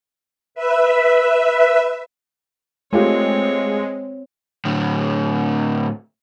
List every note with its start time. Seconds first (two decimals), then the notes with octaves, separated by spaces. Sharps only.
0.55 B4 E5
2.93 G#3 A3 C4 F4 G4 C#5
4.65 A2 D3